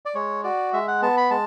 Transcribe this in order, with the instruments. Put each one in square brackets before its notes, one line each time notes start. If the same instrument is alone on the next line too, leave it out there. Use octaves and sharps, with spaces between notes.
[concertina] D5
G#3 C#5
F#4 D5
G#3 E5
F#5
B3 A5
B5
G#3 A5